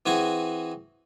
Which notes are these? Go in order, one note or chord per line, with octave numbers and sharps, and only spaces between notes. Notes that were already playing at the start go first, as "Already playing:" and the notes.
E3 C4 F#4 G#4 G#5